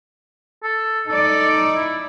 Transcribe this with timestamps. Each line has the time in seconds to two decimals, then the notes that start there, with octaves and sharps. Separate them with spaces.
0.63 A4
1.08 D#4 A4 D5
1.76 E4